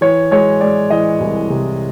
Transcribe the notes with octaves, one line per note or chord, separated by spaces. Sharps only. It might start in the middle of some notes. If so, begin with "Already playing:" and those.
E3 C#5
G#3 C#5
G#3 D5
E3 D#5
C2
C3